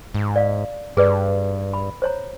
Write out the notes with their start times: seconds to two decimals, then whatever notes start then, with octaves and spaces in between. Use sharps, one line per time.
0.14 G#2
0.36 D5 F5
0.97 G2 G#4 B4 D5
1.74 B5
2.02 C5 C#5 A#5